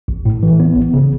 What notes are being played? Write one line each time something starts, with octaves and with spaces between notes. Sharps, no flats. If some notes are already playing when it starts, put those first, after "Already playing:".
A1
A2
E3
B3
A1
C#3